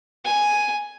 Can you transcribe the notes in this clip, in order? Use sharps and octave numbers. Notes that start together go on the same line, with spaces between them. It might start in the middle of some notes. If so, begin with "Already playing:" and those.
G#5